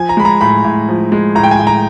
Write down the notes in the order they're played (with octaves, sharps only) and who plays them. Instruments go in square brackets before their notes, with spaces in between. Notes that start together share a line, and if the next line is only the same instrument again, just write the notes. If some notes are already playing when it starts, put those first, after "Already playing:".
Already playing: [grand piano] F3 G#5
A#5
G#3 B5
A#5
A2 B5
A2
F3
G#3
A2 A#5
G5
G#5
A2
A#5